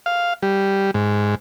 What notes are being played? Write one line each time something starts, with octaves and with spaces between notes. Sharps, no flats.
F5
G3
G#2